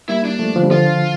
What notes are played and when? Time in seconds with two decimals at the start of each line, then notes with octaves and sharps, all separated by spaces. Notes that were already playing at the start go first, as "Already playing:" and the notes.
0.08 G3 A#3 E4
0.25 D4
0.39 F3 A3
0.55 D3 F3
0.64 G3
0.71 D3 F3 F4